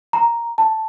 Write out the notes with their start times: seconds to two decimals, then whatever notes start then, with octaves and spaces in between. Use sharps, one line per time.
0.13 A#5
0.58 A5